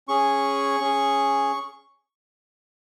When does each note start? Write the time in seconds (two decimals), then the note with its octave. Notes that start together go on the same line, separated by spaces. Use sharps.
0.08 C#4 G#4 C#6
0.80 C#4 G#4